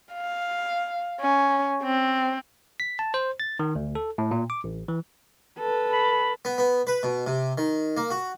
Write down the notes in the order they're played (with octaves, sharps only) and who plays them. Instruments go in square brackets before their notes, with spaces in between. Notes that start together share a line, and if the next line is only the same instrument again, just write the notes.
[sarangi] F5
C#4
C4
[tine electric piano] B6
A5
C5
A6
D#3
D2
A4
A2
A#2
D6
A1
E3
[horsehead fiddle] A4 B4
[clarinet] B5
[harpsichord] B3
B3
B4
B2
C3
D#3
A#3
F#4